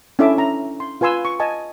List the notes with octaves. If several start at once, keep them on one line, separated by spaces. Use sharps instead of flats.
C#4 D4 E4 A4 E5 D6
C#4 A#5
C6
F4 B4 G#5 C6 E6
C#6
D#5 G#5 A5